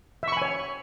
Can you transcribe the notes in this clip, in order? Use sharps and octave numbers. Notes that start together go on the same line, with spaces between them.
C#5 E5 G#5 B5 C#6